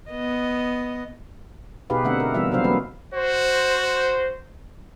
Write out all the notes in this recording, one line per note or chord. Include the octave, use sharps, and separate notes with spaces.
B3 D#5
B2 D#4 G4 G#4 B4 F5
D3 A3 C4 D4 E5 F#5
A#4
E3 G3 B3 D#4 F4 E5
C3 F#3 B3 D4 C5 F5
F#3 A#3 C#4 B4
F#4 C5